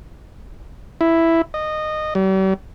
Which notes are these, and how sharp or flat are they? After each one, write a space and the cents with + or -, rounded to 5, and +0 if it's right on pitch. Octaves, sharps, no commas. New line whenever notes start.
E4 +0
D#5 -15
G3 -45